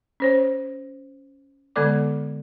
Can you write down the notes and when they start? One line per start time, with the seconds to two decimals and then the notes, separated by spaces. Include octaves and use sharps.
0.20 C#4 C5 C#5
1.76 D3 G#3 B3 A4 D5 D6